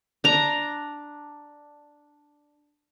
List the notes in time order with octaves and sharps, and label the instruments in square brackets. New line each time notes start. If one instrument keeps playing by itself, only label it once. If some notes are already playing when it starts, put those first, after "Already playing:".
[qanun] D4 A#5